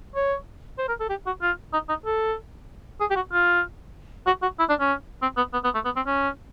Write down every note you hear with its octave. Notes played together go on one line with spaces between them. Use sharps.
C#5
C5
A#4
A4
G4
F#4
F4
D#4
D#4
A4
G#4
G4
F#4
F4
F#4
F#4
E4
D4
C#4
C4
B3
B3
B3
A3
B3
C4
C#4